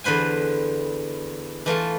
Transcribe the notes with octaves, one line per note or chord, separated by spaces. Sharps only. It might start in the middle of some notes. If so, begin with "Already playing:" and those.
E2 D3 B4 C5 G#5
E3 A3 F4 A5